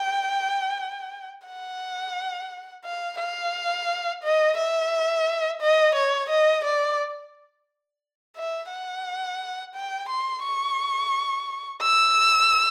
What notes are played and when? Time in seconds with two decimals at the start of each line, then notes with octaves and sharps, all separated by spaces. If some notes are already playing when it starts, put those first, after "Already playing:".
Already playing: G5
1.48 F#5
2.85 F5
3.19 F5
4.23 D#5
4.57 E5
5.61 D#5
5.95 C#5
6.30 D#5
6.65 D5
8.37 E5
8.71 F#5
9.75 G5
10.09 C6
10.43 C#6
11.82 E6